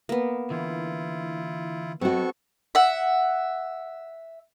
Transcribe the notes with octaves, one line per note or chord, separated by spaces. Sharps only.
A#3 B3
D3 E3 E4 F4
F#3 B3 C4 F#4 A4 D#5 C#6
E5 F#5